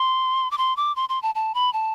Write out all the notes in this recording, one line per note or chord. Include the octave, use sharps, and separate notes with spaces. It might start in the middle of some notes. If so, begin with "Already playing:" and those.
Already playing: C6
D6
C6
D6
C6
C6
A5
A5
B5
A5